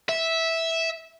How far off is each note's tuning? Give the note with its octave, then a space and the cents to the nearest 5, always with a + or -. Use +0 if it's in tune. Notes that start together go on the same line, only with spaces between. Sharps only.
E5 -10